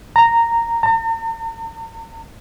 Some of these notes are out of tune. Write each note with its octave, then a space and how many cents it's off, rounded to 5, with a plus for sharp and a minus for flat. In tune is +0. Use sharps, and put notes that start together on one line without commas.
A#5 -10
A#5 -45